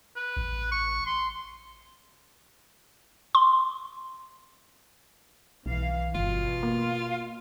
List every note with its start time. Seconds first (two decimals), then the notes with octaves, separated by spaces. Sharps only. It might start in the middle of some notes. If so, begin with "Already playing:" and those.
0.16 B4
0.37 A1
0.72 C#6
1.06 C6
3.35 C6
5.66 B1 E3 F5
6.15 G1 B2 F4
6.63 A#3